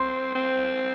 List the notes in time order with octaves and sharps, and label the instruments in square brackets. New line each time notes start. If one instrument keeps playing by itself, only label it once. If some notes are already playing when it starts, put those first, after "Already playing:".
Already playing: [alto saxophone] C4 [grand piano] C6
[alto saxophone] C4